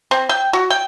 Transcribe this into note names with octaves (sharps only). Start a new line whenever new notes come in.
C4
G5
F#4
G5